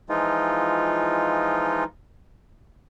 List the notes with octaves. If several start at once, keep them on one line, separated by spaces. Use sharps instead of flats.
E3 F3 G#3 D#4 F4